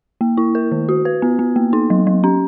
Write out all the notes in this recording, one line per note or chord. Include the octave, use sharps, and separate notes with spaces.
A#3
E4
A#4
D#3
F#4
B4
B3
B3
A#3
D#4
F#3
F#3
C#4